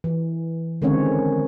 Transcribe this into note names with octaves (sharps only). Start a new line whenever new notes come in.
E3
D3 D#3 G#3 C4 C#4 C#5